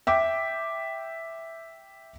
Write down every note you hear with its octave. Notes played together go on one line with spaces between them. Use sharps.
E5 G5 D6